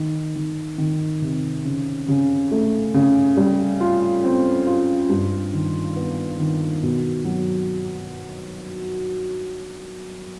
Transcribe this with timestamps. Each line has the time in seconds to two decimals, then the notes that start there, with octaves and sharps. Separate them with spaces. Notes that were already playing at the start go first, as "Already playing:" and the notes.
Already playing: D#3
0.36 D#3
0.78 D#3
1.22 C3
1.65 C#3
2.08 C#3
2.51 A3
2.94 C#3
3.37 G3
3.80 F4
4.24 C4
4.67 F4
5.10 G2
5.53 D#3
5.96 B3
6.39 D#3
6.83 B2
7.25 F#3